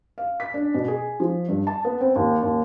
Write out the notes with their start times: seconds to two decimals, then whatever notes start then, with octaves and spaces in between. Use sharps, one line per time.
0.18 F5
0.40 B6
0.54 D4
0.74 B2
0.88 G#4
1.20 F3
1.48 G2
1.67 A5
1.85 B3
2.01 C4
2.16 D#2
2.43 D#2